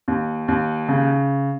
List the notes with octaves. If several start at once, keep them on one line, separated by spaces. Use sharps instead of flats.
D#2
D#2
C#3